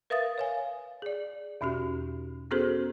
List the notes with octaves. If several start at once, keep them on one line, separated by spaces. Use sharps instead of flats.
A#4 B4 E5 F5 D#6 A6
C#5 F5 G#5
G#4 D5
E2 B2 C#4 F#4 G4
B3 C#4 F#4 G#4 A4 C5